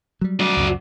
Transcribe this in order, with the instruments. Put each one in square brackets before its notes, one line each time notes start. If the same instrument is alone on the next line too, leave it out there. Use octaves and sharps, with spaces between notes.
[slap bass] F#3 G3
[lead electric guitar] F#4 D5
[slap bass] C#2 F#2